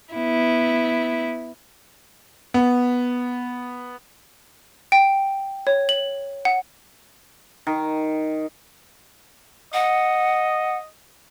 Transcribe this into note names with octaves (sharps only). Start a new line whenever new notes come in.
B3 E4
B3
G5
C#5
F#7
F#5
D#3
D#5 F#5